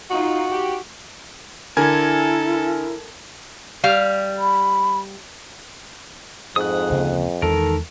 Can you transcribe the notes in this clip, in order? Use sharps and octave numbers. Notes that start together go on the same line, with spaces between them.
D#4 F4 F#4
G4
D3 E4 A4 A#4 G#5 G#6
G3 F5
B5
F2 G#2 D#6 F#6
D2 C#3 A#3
E2 D#3 G#3 A4 A#4